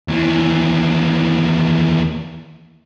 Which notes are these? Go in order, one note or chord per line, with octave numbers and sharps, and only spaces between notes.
D#2 E3